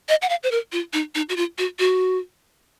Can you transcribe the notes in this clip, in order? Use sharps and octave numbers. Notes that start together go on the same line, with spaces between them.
D#5
F#5
F5
C5
A#4
F4
D#4
D#4
F#4
F4
F#4
F#4